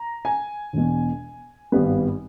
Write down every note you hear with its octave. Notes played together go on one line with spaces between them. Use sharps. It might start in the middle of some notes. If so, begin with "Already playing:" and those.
Already playing: A#5
G#5
E1 E2 B2
G#1 G2 G3 B3